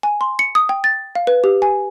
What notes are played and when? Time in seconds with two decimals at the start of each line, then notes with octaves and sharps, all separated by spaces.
0.03 G#5
0.21 C6
0.39 C#7
0.55 D#6
0.69 G5
0.84 A6
1.15 F5
1.27 B4
1.44 G4
1.62 G#5